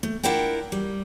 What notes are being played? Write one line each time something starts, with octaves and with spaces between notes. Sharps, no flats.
A3
D4 E4 F4 A#4 F#5 G5
G3